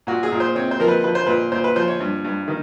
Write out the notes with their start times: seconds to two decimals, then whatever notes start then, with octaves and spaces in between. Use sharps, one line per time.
0.07 A#2 F#4
0.23 G#4
0.32 A#2
0.40 C5
0.55 C4 C#5
0.71 C5
0.80 F3 A#4
0.88 B4
1.04 F3 B4
1.15 C5
1.26 A#2 B4
1.52 A#2 C5
1.64 B4
1.76 F3 C5
1.88 C#5
2.00 G2
2.24 G2
2.48 D#3